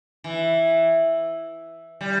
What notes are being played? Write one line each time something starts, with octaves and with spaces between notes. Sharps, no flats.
E3
G3